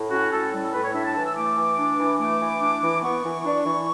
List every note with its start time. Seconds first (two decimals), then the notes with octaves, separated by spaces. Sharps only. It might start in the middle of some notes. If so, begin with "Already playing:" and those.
Already playing: A2
0.10 C#4 F#4
0.31 A2 A4
0.52 G3
0.63 A4
0.73 A2 B4
0.84 C#5
0.93 D4 E5
1.05 A5
1.15 E3 A5
1.26 E6
1.36 A3 D6
1.56 E3
1.77 D4
1.99 E3
2.19 A3 D6
2.40 E3
2.61 D4
2.81 E3
3.02 B3 C#6
3.24 E3
3.45 D4
3.65 E3